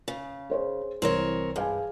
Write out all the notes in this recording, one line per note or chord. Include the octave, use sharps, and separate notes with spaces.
C#3
G#4 C5 C#5
C2 E3 C4 A#4 C#5
G2 G#4 F5 G#5